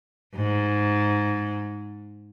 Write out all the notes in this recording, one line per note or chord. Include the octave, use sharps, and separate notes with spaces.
G#2